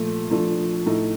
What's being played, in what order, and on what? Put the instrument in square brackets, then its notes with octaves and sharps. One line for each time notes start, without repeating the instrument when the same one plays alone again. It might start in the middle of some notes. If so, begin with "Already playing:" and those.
Already playing: [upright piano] A#2 F3 A3
F3 A3 D4
A2 A3 D#4